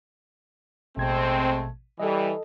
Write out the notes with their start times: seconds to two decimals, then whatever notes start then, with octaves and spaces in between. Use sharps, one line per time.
0.97 A1 B2 G#3 A3 C4 G#6
2.00 E3 G3 A4 D#5